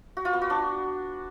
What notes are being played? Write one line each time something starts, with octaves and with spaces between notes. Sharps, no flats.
F#4
F4
B3
F#4
D4